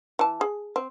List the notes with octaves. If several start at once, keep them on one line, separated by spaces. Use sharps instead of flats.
E3 A5
G#4
C4